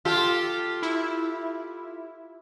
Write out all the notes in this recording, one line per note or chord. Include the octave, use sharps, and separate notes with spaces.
F4 G4 A4
E4